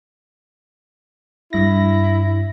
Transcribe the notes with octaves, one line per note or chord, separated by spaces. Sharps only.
G2 E4 A#6